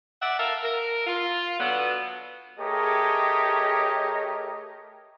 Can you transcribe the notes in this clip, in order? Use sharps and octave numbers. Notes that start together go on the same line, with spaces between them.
D5 E5 F#5
A4 A#4 E5 F5
A#4
F4
D3 F#3 B3
A3 G4 G#4 A#4 C#5 D#5